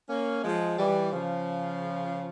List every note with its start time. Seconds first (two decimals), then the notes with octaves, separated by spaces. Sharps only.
0.09 A#3 C#4
0.43 F3 G#3
0.77 E3 G3
1.12 C#3 F3